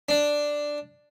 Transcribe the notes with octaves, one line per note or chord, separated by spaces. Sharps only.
D4